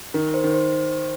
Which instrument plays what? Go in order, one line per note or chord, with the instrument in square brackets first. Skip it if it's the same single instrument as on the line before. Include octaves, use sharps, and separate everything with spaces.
[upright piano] D#3 [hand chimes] A#4
[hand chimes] C5
[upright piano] D#3
[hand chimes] C5